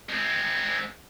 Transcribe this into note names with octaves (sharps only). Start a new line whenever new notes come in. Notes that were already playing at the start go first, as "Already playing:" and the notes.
G#3 C4